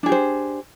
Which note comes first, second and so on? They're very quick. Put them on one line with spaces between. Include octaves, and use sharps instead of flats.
D4 G#4 G4 C5